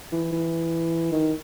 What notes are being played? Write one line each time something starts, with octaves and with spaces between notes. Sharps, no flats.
E3
E3
D#3